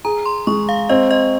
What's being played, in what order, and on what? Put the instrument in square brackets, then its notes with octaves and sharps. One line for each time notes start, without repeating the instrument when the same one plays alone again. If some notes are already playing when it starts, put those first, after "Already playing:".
[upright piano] G#4 [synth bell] A#5
[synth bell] C6
[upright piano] G#3 [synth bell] C#6
[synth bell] F5
[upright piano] C4 [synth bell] D#5
[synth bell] D#5